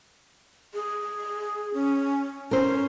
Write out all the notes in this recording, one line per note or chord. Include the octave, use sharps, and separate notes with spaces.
G#4
C#4
C#4 A#4 C5